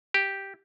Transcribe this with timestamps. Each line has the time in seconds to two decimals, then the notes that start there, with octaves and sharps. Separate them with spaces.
0.14 G4